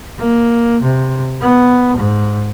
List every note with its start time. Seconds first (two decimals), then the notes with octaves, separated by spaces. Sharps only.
0.19 A#3
0.82 C3
1.41 B3
1.97 G#2